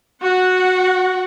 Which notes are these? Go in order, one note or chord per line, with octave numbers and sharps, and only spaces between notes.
F#4 F#5